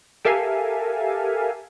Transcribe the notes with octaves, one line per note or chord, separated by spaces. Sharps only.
G4 A4 A#4 E5 F5 G#5